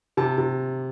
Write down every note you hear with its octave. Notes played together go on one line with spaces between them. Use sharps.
C3 A5
C3